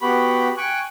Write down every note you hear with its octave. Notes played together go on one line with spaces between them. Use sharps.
B3 F#4 G4 B5
G5 G#5 C#6 F#6